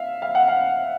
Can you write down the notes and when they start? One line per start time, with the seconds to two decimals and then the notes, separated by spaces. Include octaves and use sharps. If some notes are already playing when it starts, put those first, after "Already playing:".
Already playing: E5 F5
0.22 F5
0.35 F#5
0.48 F5